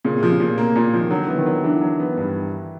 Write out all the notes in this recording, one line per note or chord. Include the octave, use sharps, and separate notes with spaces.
A#2 C#3
C3 F3
C#3
A#2
A#3
A#2
F3
D#3
D3 F#3
E3 B3
D#3
F#3
E3 D4
F#3
B3
G2